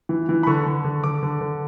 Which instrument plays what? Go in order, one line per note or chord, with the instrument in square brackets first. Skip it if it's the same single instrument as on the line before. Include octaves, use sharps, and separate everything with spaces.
[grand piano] E3
E3
B5
D3 C#6
D3
D3
D3 D6
D3
D3